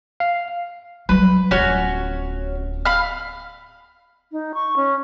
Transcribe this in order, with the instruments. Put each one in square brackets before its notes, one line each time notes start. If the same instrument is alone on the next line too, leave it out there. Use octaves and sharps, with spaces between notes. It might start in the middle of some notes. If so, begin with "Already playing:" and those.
[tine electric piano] F5
[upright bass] F#3 G3 [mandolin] B4
[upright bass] D1 F4 [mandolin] C#4 F#4 C#5
[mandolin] F5 B5 F6
[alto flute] D#4
C#6
C#4